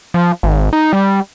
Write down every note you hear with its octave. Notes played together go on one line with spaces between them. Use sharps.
F3
G#1
D#4
G3